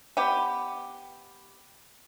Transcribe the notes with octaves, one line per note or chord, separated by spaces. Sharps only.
B3 G4